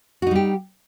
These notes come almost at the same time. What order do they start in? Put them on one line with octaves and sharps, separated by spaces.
F#4 D#4 G3 G4